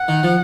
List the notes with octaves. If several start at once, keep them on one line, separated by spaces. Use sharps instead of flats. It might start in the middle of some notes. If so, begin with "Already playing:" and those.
Already playing: F#5
D#3
F3